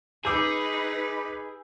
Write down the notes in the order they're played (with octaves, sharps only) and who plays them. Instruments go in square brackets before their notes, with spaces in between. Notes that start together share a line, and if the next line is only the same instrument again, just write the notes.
[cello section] D#4 B4 [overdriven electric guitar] G#4 [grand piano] D6 E6 G6